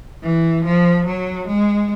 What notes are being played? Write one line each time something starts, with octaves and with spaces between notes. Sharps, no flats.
E3
F3
F#3
G#3